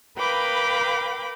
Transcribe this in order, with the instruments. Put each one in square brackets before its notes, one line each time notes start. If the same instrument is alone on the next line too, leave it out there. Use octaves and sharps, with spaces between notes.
[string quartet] A#4 B4 F5 G5 B5 D6